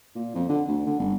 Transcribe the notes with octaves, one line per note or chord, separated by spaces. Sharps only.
A#2
F2
D3
D2
D3
G1